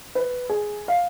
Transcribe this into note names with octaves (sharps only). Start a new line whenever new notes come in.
B4
G#4
F5